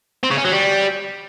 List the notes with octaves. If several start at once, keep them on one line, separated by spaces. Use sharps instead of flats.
C4
C#3
C#4
F#3
G3